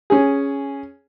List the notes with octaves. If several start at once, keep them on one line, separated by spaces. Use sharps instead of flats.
C#4 G#4